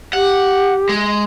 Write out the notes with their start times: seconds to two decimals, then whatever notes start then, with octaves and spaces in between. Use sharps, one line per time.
0.13 G4 F#5
0.89 G#3